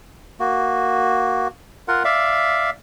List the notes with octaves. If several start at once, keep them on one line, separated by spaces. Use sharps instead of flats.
A#3 F#4
F4 A#4 F#5
D5 E5 F5